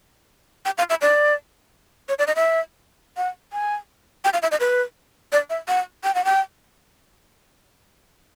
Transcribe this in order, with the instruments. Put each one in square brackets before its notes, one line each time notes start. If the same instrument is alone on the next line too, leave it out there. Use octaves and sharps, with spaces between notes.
[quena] G5
F5
E5
D5
C#5
D5
D#5
E5
F#5
G#5
G5
F5
E5
D#5
B4
D5
E5
F#5
G5
F#5
G5